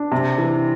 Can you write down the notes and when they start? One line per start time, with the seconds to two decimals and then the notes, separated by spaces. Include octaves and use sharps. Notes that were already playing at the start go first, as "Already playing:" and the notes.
Already playing: D4
0.11 C3
0.38 E3